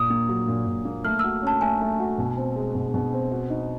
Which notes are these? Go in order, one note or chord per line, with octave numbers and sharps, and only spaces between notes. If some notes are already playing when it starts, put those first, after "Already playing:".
Already playing: A#2 D#6
A#3
F#3
A#2
A#2
A#3
A3 F6
F#4 E6
C#4 A5
A3 G#5
A3
F#4
B2
C4
G#3
B2
B2
C4
F#4
D#4